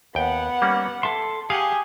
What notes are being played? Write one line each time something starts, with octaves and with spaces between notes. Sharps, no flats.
D#2 B3 F#5 G5
G3 A#3 C#4
A4 E5 C6
G4 G#4 F5 F#5 G#5